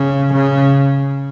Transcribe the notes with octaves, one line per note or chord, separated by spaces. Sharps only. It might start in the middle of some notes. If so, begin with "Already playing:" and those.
Already playing: C#3
C#3